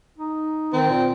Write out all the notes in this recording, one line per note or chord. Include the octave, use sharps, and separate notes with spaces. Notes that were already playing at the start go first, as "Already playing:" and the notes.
D#4
D#3 C4
A#2